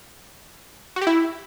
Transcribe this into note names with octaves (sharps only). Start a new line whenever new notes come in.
F#4
G4
E4